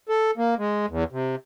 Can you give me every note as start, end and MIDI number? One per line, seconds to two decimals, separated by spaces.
0.09 0.31 69
0.38 0.55 58
0.58 0.86 56
0.89 1.04 40
1.12 1.35 48